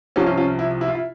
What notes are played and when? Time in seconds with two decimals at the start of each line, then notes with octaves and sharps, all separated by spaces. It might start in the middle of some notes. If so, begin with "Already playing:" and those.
0.16 C2 C3 F3 C#4 F4
0.27 C#4 F4
0.37 C#4 F4
0.59 E4
0.81 E4
0.88 F4
0.95 E4